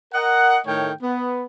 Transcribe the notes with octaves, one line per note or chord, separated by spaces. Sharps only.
A#4 D#5 F#5
A2 D#3 A3 C#5 G5
B3